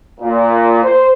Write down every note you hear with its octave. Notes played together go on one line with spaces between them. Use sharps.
A#2
C5